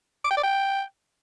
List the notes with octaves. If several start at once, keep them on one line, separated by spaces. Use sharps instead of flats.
D6
G5
D5
G5